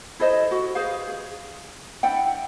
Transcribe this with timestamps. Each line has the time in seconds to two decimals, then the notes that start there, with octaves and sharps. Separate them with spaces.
0.19 E4 A4 C5 D#5
0.51 F#4
0.75 G#4 B4 C5 F5
1.07 G#4
2.03 D4 E4 F#5 G5